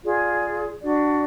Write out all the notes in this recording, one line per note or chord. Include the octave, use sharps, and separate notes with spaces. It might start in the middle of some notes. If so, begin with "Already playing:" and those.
F4 G#4 D5
D4 F#4 D5